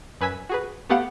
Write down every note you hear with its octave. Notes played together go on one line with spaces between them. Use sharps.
F#2 B4 G#5 E6 G#6 B6
F#4 G#4 B4
A3 B3 G4 F5 F#5